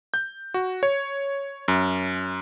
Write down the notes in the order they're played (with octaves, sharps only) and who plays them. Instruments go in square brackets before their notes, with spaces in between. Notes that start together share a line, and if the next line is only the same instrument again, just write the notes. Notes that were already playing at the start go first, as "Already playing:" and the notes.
[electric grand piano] G6
F#4
C#5
F#2